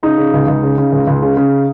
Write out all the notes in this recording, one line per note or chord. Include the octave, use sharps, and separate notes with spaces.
C#3 D#4
C#3
C#2
C#2
C#3
C#3
C#2
C#2
C#3
C#3